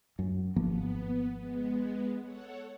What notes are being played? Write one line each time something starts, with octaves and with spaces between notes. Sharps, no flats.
F#2
G#1 F3 A#3 B3
G#3 B3
A4 C#5 F#5